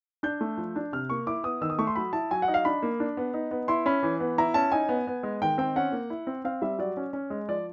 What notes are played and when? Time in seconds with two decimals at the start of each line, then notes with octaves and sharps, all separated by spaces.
0.23 D4 G6
0.41 A3
0.58 F3
0.76 D4
0.92 C3 F6
1.10 A#3 C#6
1.27 E4 D6
1.44 B3 D#6
1.61 D#3 E6
1.70 D#6
1.79 A3 C#6
1.87 C6
1.96 F#3 B5
2.13 E4 A5
2.31 F#3 G#5
2.42 F#5
2.48 D#4
2.54 F5
2.65 D4 B5
2.83 A#3
3.00 D4
3.17 B3
3.34 D#4
3.51 B3
3.68 E4 C6
3.86 C#4 B5
4.03 E3
4.20 B3
4.38 E4 A#5
4.54 C#4 A5
4.72 D#4 G#5
4.89 B3
5.07 B3
5.23 G#3
5.42 D#3 G5
5.58 C4 G5
5.76 C#4 F#5
5.92 A#3
6.10 E4
6.27 C4
6.45 C4 F5
6.62 G3 E5
6.79 F#3 D5
6.97 C#4
7.13 C#4
7.30 G#3
7.48 F3 D5